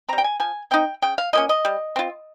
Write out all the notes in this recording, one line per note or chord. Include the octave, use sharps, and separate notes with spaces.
G3 C4 A#5
G5
G#5
F3 G#5
C4 D#4 G5
C#3 G5
F5
F3 A#3 C#4 D#5
D#5
G3
C4 F4